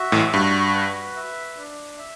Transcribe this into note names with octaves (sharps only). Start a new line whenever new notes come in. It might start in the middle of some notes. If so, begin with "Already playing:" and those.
Already playing: F#4 E5
A1 A2
G2 F#4
B4
E5
D4
E5